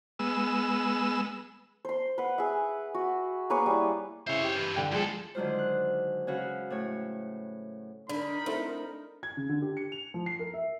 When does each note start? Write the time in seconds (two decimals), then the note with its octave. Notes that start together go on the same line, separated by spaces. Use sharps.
0.19 G#3 B3 E6
1.85 C5 C6
2.18 B4 F#5
2.38 G#4 E5
2.94 F#4
3.50 A#3 G#4 B4 C#5
3.66 G3 E4
4.27 C#3 E4 C5 C#5
4.43 G4
4.56 G2 E3
4.76 D3 G5
4.92 E2 F3 G#3 G#4 A4
5.35 D3 D#3 F#3 G#3 F4 C5
5.58 F#6
6.27 C#3 C#4 F#4 B4 F5
6.70 A2 C#5
8.09 D3 D4 D#4 A#4 B5
8.46 D2 C4 E4 A4
9.23 G#6
9.37 C#3
9.49 D3
9.62 G4
9.77 C#7
9.92 F7
10.14 F3
10.26 C7
10.39 A#4
10.53 E5